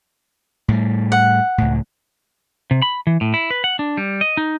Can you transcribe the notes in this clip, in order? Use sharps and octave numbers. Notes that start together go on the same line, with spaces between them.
A2 G3
F#5
C#2 A2
C3
B5
E3
A2
E4
B4
F#5
D4
G3
D#5
D#4